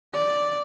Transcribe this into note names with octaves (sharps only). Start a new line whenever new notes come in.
D5